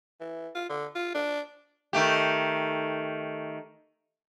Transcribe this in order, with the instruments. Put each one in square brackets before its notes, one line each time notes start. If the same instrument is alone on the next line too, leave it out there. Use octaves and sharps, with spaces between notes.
[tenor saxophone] E3
F4
D3
F4
D4
[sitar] D#3 A3 G4